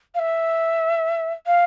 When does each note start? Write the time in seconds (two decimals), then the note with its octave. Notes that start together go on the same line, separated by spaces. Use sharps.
0.14 F5
0.19 E5
1.46 F5